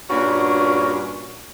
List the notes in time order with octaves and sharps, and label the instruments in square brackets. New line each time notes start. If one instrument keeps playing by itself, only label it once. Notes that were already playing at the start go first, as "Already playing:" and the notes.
[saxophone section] G2 A#2 A#3 C#4 D4 F#4